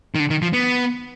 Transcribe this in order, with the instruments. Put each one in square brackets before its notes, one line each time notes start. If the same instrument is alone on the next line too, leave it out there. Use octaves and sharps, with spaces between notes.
[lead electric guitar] D#3
D3
D#3
F3
B3